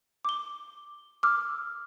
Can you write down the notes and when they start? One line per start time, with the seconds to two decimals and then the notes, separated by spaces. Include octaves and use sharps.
0.25 D6 G7
1.23 D6 E6 F6